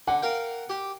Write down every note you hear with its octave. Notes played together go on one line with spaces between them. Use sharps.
D3 F#5
A#4 F5 G5
G4